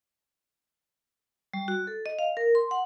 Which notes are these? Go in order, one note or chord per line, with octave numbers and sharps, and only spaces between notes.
G3
F#4
A4
D#5
F5
A#4
C6
F#5